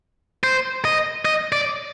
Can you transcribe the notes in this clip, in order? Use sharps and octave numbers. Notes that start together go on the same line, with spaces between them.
C5
D#5
D#5
D5